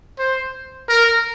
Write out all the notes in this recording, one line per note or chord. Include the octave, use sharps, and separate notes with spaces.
C5
A#4